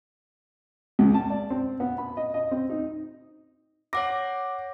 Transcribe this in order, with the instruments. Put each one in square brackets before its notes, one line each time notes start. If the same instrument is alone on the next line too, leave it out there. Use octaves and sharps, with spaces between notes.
[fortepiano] C#2
A5
D5
C4
B3
B5
D#5
D#5
C4
D#4
[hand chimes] C#5 F#5 A#6 [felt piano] D6